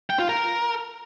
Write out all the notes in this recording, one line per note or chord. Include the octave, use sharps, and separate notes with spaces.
G5
F4
A#4